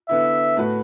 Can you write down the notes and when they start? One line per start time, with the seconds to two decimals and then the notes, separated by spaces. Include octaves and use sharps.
0.09 D3 B3 E4 E5
0.57 A2 A3 F#4 B4